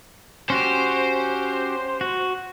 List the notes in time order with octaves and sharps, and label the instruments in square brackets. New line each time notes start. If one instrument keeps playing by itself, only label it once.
[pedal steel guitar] C#4 F#4 G4 [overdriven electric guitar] C5
[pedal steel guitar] F#4